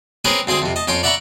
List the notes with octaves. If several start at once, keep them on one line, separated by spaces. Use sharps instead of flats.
C4 C#4 G#4 A#4 B4
D2 C4 G#4 C6
F2 C3
D#5 A5
F2 C#4 G5 C6
D5 E5 F#5 A#5 B5 C#6